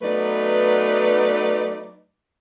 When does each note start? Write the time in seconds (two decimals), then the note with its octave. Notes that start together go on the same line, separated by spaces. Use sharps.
0.02 F#3 A3 B3 D#4 B4 D5